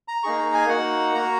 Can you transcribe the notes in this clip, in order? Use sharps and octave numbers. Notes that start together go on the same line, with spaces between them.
A#5
A#3 D#4 G#4 C#6
A#5
G#5
A#3 D#4 F#4 F#5
A#3 F#4 A#5